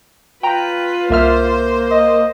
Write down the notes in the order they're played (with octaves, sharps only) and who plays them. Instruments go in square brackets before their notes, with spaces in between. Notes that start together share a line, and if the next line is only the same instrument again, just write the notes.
[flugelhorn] F4 [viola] B4 [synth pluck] G5 A#5
[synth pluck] C2 E5 F6 [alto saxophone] A#3 [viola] C5
[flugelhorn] D#5